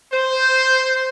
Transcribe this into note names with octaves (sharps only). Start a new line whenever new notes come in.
C5